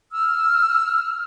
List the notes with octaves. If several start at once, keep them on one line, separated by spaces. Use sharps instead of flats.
E6 F6